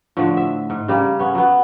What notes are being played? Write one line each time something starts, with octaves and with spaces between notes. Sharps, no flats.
A2 D3 F3
E5
G#2
C#3 G3 A#3
B3 C#4
F#3 B3